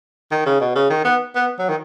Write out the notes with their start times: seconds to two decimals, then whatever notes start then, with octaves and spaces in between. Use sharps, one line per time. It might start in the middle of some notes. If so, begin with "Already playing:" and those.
0.31 D#3
0.46 C#3
0.61 B2
0.75 C#3
0.90 D#3
1.05 B3
1.35 B3
1.59 F#3
1.69 D#3